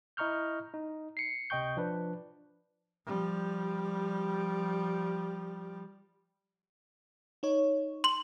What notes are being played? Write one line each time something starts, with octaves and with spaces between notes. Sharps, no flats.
E4 D#5 A#5 C#6 F6 G6
D#4
C7 C#7
C#2 C3 D#5 G5 C#6 G6
F3 D4 B4
F3 G3
D#4 C#5
C6 F#7